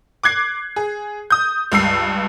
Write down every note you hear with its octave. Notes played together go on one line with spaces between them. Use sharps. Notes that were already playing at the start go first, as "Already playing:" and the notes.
D6 F#6 G#6 C7
G#4
D#6 G6
C#2 G2 E6 C7